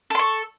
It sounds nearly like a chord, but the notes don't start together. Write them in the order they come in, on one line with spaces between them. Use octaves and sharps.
A4 C6 C#6